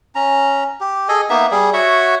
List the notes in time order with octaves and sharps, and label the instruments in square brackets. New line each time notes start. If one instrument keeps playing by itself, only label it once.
[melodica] C#4 A#5
G4
G#4 A4 D#5 G#5
A#3 B3 D#4 E5
G3 G#4
F#4 C#5 E5 F#5